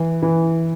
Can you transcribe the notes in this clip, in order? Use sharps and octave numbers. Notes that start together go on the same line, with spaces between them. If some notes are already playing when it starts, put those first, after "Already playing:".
Already playing: E3
E3